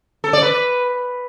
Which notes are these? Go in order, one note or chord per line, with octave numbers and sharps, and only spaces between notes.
A4
D5
B4